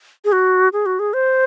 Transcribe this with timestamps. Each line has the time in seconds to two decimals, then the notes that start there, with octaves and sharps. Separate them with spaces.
0.25 G#4
0.32 F#4
0.73 G#4
0.86 F#4
0.99 G#4
1.14 C5